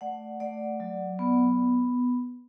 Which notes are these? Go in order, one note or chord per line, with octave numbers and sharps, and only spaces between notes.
A3 D5 F#5
A3 D5 F#5
F#3
B3